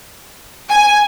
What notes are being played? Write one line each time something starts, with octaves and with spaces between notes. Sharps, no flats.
G#5